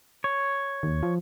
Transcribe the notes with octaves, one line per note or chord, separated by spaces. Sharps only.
C#5
D#2
F3